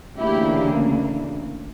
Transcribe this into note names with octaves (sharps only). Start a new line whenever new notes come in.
D2 C#3 E3 A#3 D4 E4 G4